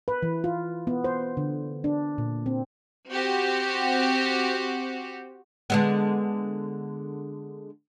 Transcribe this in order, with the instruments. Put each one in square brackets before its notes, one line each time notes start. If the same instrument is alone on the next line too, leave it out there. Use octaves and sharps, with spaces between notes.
[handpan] B4
E3
F4
B3
C5
D3
D4
A#2
C4
[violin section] C4 F#4 G4
[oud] D3 G#3 B3